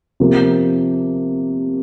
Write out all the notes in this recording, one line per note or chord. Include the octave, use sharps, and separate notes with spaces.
C3 F3 A#3